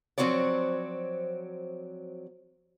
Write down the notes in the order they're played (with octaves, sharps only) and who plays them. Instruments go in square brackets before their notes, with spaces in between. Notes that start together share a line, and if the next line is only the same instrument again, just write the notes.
[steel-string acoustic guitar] F3 F#3 C4 F#4 C#5 D5